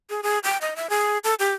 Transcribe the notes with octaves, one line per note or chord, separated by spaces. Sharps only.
G#4
G#4
G5
D#5
E5
G#4
A4
G4